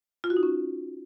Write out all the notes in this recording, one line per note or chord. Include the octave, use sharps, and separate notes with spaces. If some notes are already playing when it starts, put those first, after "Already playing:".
F4
F#4
D#4
C#4